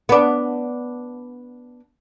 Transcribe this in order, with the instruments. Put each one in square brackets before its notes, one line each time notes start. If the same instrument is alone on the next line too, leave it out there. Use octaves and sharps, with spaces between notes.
[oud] B3 D4